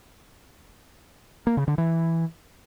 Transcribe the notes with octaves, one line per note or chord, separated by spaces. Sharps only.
A#3
C#3
D3
E3